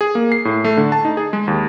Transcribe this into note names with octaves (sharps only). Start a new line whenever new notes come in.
G#4
A#3
C7
A2
A3
D3
A5
D#4
G#4
G#3
D#2